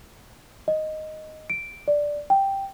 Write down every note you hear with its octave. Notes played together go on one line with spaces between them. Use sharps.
D#5
D7
D5
G5